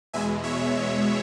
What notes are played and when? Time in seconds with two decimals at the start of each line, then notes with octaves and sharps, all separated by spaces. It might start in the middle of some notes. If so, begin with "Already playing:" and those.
0.13 E2 B2 G#3 E5 G#5
0.43 C#5 E5